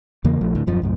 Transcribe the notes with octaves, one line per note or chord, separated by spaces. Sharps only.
E2 C#3 E3 A#3
A#1 F3 A3
D2 A2 D3
D#1 F#2 F3
C2 F#2 A2